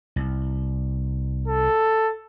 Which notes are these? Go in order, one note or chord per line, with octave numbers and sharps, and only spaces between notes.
C2
A4